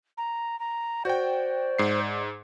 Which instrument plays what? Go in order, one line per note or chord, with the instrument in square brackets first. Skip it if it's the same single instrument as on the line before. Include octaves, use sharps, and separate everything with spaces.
[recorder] A#5
A#5
[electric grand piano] F#4 G5 [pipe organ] C5 [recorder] D5
[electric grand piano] G#2 C7